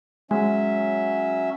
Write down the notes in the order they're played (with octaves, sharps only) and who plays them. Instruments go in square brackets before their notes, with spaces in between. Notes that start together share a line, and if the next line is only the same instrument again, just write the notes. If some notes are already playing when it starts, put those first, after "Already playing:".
[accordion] F#3 C#4 E5 [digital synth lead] G#3